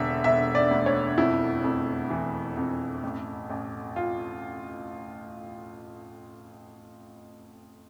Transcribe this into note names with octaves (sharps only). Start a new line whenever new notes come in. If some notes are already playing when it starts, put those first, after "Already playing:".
Already playing: E1 D3 E5
E1 E5
D5
D2
C#5
F2 E4
F2
E3
F2
A1
A1
F4